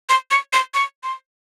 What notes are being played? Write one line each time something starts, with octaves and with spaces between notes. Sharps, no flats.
C6
C#6
C6
C#6
C6